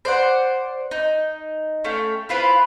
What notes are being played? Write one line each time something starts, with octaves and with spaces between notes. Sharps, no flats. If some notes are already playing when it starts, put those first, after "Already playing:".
C5 D5 F#5
D#4
A3 C#4 F5 G5
E4 F4 B4 C5